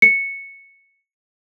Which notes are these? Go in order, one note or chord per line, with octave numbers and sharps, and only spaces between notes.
C#7